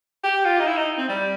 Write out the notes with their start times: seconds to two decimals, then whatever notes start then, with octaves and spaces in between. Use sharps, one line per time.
0.23 G4
0.45 F4
0.60 D#4
0.67 E4
0.77 D#4
0.98 C4
1.08 G3